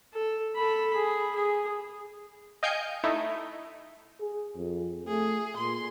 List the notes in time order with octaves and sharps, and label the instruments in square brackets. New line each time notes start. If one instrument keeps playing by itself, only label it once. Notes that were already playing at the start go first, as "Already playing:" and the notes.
[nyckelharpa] A4
A4 B5
G#4
G#4
[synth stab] D#5 F5 G5 G#5 G6 C#7
A3 D#4 E4
[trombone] G#4
F2
[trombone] A3 [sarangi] G#4
[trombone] A#2 [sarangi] C6